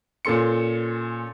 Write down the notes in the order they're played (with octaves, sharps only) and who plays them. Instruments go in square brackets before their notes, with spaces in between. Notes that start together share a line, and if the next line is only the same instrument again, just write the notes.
[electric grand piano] A#2 C#4 A4 C6 C#7